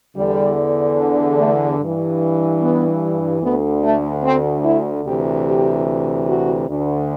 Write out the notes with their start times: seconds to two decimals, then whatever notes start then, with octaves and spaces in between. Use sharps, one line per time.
0.16 E2 D3 G3
1.38 A3
1.78 G2 E3
2.60 B3
3.42 D2 D3 B3
3.83 A3
4.23 C4
4.64 E4
5.04 D2 C3 E3 G4
5.45 G4
6.27 F#4
6.68 D2 D3